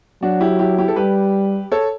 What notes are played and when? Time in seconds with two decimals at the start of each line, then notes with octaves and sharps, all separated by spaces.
0.22 F#3 D4 F#4
0.40 E4 G4
0.59 E4 G4
0.78 E4 G4
0.88 A4
0.96 G3 G4 B4
1.72 A4 C#5